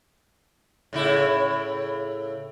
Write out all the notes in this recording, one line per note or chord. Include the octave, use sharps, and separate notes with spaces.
A2 C#3 E4